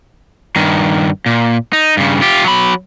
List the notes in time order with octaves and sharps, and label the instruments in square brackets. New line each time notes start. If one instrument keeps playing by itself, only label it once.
[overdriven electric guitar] G2 D#3
A#2
D#4
G2 C#3
F4 G4
F#3 B5